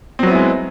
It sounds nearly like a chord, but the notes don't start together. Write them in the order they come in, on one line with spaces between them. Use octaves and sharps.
C4 F#3 B3 E4 G#3